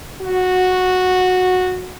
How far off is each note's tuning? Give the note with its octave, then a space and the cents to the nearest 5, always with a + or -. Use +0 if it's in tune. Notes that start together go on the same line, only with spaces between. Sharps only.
F#4 -10